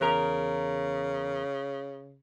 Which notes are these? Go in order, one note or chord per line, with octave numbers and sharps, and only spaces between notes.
E2 C#3 A#4 A#5